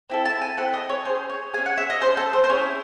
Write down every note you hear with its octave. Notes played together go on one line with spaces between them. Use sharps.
C4 E4 A4
A5
G#5
C4 E4 A4 F#5
D#5
C#5
C#4 G#4 C5
C#5
C#4 G#4 G#5
F#5
E5
D#5
C#4 E4 G#4 C5
A4
C5
C5
C#4 E4 G#4 C#5